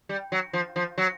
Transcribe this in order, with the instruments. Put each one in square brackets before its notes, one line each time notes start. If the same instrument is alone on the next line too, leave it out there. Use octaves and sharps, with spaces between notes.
[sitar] G3
F#3
F3
F3
F#3